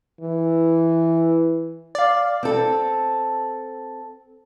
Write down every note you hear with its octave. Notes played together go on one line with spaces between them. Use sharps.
E3
D5 F5
C4 A4